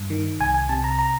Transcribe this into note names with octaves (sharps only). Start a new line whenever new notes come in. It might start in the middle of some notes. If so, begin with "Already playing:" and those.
Already playing: G2
D#3
C2 G#5
G#5
C3 A5
A#5
A#5